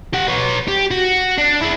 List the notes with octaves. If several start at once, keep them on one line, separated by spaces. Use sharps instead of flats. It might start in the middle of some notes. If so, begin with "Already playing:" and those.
G4 F#5
B4 C#5
G4
F#4
D4
E4 G#4